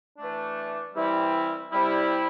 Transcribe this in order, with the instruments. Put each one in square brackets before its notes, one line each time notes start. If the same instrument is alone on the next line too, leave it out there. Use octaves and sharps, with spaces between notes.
[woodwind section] E3 A3 D4
E3 G3 C4 E4
C3 G3 E4